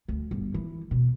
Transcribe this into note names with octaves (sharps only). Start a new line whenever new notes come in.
D2
G1
E3
B2